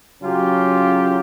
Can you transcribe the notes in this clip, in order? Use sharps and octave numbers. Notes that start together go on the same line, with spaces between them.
C#3 F#3 C#4 F4 G4